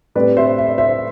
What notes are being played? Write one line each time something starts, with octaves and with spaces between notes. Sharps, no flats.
A2 G3 C4 B4 D5
C5 E5
E5
D5
C5 E5